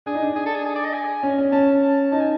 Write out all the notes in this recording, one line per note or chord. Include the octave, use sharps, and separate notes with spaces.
D4 G#4
D#4
D4
G#4
A4
G#4
G#4
D5
D#5
G#5
C#4
C#4
C#4 A5
A5
D#4 A5
G#5